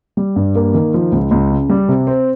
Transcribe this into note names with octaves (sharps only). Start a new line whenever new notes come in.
G3
G2
A#3
D#3
F3
C#2
C#2
C#3
G3
C3
C4